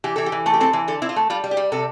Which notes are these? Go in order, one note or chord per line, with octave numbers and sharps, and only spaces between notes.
E3 G4
E3 A4
G4
E3
A3 A4
G4
C4 A4
E3
D3 A4
C4 E4
F4
A3
G3 F4
G3
G4
G3
C3 A4